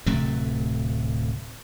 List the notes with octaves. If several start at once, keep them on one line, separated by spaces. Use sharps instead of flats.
D1 C3 F#3 A3